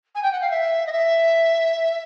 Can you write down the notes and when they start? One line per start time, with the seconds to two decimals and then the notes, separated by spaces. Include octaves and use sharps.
0.15 G#5
0.22 G5
0.32 F#5
0.41 F5
0.50 E5
0.86 D#5
0.92 E5